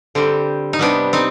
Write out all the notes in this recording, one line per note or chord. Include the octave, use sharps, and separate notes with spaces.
D3 G3 C4
D#4
C3 G3 B3 D4
C4 D#4